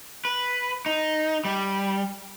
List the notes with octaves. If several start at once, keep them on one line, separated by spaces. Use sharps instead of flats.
B4
D#4
G3